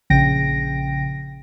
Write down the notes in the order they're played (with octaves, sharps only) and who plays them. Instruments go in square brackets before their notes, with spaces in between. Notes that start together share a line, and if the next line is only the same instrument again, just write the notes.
[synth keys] A#1 C#3 G5 A#6 D7